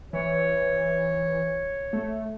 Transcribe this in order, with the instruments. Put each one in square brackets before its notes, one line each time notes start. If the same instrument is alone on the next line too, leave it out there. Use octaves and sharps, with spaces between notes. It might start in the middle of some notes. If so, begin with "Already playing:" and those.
[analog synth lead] E3 [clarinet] C#5
[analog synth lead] A3